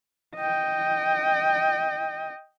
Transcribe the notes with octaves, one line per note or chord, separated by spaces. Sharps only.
D#5 G5